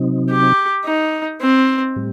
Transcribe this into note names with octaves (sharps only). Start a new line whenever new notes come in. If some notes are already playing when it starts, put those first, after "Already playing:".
Already playing: C3 F#3 C4 D#4
G4
D#4
C4
A2 G3